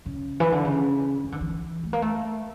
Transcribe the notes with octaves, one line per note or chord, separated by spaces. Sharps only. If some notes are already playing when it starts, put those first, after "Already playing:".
C#3
E3
D3
C#3
E3
D3
E3
A3
A#3
A3